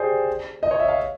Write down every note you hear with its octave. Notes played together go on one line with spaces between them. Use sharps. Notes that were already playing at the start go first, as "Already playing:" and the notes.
Already playing: G4 G#4 C5 D5
D#5
C#5
E5
F5